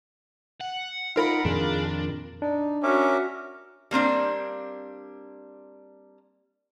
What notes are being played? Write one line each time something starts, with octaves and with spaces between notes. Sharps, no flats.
F#5
D#4 F4 A#4 B5
F2 A#2 D#3 D4 G#4
D4 D#4
C#4 F#4 A#4 E5 D6
G3 A#3 C4 D4